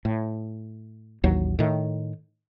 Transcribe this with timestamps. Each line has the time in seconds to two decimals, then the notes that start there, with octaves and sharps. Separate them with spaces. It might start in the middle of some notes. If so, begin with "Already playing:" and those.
0.05 A2
1.24 A1 D#2 F#3
1.59 A2 D#3